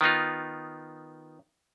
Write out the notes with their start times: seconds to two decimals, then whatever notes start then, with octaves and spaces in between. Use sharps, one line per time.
0.01 D#3 B3 D#4 F4